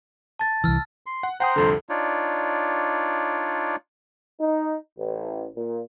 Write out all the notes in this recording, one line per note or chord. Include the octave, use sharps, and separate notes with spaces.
A5 A6
C2 E3 E6 F6
C6
F#5
C5 F#5 G5 A#5 C6 D#6
C2 F2 D3 A4
D4 D#4 F4 C#5 D5
D#4
A1
A#2